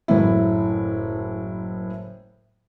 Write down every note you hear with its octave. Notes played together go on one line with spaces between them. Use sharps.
F#1 A2 E4